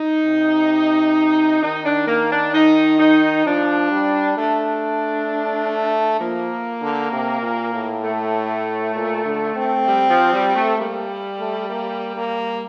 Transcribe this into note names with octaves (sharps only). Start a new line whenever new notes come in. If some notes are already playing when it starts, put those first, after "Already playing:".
Already playing: D#4
C3
D#3 D#4
D4
A#3
D4
D#4
D#4
F3 D4
G3
A3 D4
F3 A#3
D3
C3
A#2
A2
A3
A#2
D3
C4
G3
F3
G3
A3
G3 A#3
A3
A#3
A#3